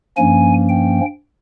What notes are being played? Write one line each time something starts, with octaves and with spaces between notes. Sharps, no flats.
G2 F3 A#3 C#4 G#5
G5